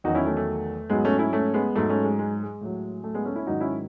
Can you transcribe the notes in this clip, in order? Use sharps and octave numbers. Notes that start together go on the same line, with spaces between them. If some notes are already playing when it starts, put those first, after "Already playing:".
E2 D#3 F#3 D#4 F#4
C#4 E4
A3 C#4
A3
G#2 F#3 G#3 B3
A3 C#4
C#4 E4
A3 C#4
G#3 B3
G#2 F#3 A3
A3 C#4
G#3
G#3
G#3
A2 F#3
A3
G#3 B3
A3 C#4
C#4 E4
G#2 D#3 F#3 D#4 F#4
C#4 E4